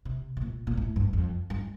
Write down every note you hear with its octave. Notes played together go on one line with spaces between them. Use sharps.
C3
C3
A#2
A#2
A2
G2
F2
G2